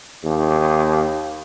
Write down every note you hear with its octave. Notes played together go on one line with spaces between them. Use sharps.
D#2